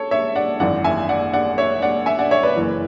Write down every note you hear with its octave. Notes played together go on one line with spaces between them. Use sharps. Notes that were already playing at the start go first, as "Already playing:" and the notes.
Already playing: A4 C#5
C#5 E5
D5 F#5
G#1 F#2 E3 D5 F#5
E5 G#5
D5 F#5
D5 F#5
C#5 E5
D5 F#5
E5 G#5
D5 F#5
C#5 E5
B4 D5
F#1 F#2 E3